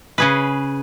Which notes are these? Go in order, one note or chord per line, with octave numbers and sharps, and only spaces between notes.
C#3 G#4 B4